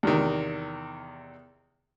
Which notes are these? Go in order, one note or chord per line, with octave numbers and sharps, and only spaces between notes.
E2 C3 D#3